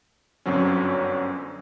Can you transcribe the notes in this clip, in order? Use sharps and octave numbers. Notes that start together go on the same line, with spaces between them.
G1 F#2 D3 F#3 C4 C#4